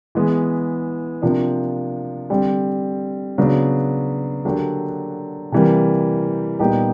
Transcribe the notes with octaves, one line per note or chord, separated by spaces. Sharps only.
E3 G#3 B3
C3 F3 A#3 D4
D3 G3 C4
C#3 F#3 B3 D4
D3 F#3 A#3 D4 G4
C3 E3 G3 A#3
A#2 G3 B3 D#4 G4